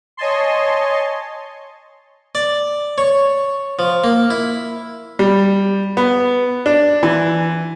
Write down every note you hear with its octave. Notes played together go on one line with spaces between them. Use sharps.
C#5 D#5 G#5 A5 C6
D5
C#5
F3
A#3
E4
G3
B3
D4
E3